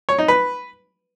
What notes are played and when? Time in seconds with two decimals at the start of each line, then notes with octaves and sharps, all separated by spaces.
0.09 C#5
0.18 D#4
0.28 B4